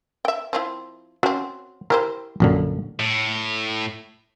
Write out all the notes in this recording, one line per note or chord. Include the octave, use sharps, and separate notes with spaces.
E5 G5
F3 C4 E4
C4 C#4 F#4
E4 G4 A#4 C5
A#1 F#2 D3
A2